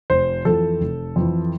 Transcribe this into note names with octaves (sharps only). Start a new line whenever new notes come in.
F1 C5
F2 E3 A4
F1
F2 E3